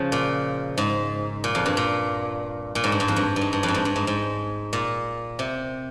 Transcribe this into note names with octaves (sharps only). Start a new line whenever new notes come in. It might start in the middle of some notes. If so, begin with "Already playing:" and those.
Already playing: C#3 F3
A#2
G#2
A#2
F2
G2
A#2
A#2
G#2
G2
G#2
F2
G2
G2
G#2
G2
F2
G#2
G2
G2
G#2
G#2
A#2
C3